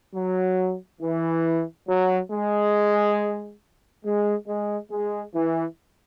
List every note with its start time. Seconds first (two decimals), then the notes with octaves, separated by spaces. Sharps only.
0.15 F#3
1.01 E3
1.88 F#3
2.31 G#3
4.04 G#3
4.47 G#3
4.91 G#3
5.34 E3